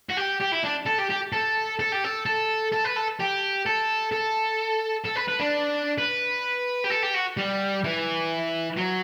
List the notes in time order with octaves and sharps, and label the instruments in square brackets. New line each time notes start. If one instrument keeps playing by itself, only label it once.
[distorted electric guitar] F#4
G4
G4
E4
D4
A4
G4
G4
A4
A4
G4
A4
A4
A4
B4
A4
G4
A4
A4
A4
B4
B4
D4
B4
G4
A4
G4
F#4
G3
E3
F#3